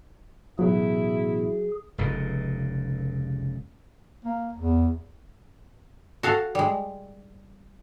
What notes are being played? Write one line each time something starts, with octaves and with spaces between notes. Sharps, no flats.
A1 B2 F#3 E4 G#4
F1 C#2 A#2
A#3
E2
F#4 A4 F5
G3 G#3